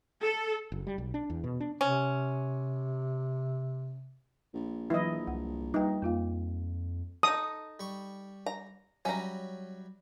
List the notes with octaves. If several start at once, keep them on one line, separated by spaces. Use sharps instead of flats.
A4
F#1
G3
B1
D4
E2
B2
D4
C3 C#4
A#1
E3 F#3 E4 B4 D#5
C2 F#5
G3 D#4 B4 G5
F2 A#3 F4 F5
D#4 A4 D#6
G3 C#6
A#5
F#3 G3 C#4 E5 A#5